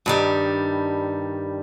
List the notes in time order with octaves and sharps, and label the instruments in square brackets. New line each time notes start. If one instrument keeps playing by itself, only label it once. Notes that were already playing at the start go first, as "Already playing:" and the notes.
[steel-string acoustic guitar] G2 D#3 G3